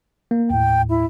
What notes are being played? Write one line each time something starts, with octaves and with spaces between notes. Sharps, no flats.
A#3
D#2 A2 G5
E4